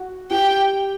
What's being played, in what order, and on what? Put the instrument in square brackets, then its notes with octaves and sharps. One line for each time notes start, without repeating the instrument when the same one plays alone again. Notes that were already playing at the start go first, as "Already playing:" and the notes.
Already playing: [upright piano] F#4
[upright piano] G4 [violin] G5